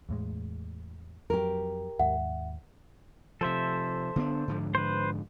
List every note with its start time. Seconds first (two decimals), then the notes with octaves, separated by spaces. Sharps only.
0.09 E2 A2 G#3
1.30 F2 F#3 G4 A#4
1.99 D#2 G#2 E5 F#5
3.41 C3 F3 A4 C5 E5
4.16 D3 B3 D4
4.48 G#2 D3 F3
4.75 B4 C5